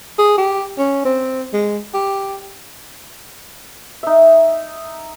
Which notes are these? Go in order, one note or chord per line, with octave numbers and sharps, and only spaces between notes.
G#4
G4
C#4
C4
G#3
G4
D#4 E5